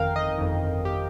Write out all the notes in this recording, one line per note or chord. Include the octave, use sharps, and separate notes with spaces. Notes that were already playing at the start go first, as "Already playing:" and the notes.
Already playing: G1 F2 D#3 A#4 F5 G5
D#5
G1 F2 D#3
G4